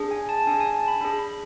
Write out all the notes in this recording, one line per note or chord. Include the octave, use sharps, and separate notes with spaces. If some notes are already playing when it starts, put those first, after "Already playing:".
Already playing: D4 G#4
G#5
A5
D4 G#4 G#5
G#5
A5
B5
D4 G#4 B5
B5